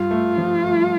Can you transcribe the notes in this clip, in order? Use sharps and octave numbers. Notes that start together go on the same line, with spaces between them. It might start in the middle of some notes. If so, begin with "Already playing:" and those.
Already playing: G2 F4
A3
F3
A3